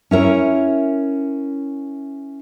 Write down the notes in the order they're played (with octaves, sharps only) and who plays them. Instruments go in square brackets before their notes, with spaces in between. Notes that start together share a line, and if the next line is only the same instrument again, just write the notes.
[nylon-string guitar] C#4 E4 A#4 C#5